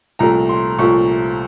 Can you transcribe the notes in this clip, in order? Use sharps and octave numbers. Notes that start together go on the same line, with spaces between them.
C2 A#2 F3 A3 A#5
C6
C2 A#2 F3 A3 C#6